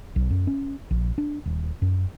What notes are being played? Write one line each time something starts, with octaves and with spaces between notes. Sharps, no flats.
B1
F#2
C#4
A#1
D4
D#1
F#2